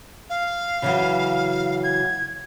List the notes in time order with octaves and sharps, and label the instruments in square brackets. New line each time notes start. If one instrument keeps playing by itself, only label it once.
[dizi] F5
[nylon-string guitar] C#3 E3 F#3
[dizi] G#6